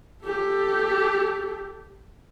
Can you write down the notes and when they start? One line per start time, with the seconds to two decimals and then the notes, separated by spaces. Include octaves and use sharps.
0.25 G4 A4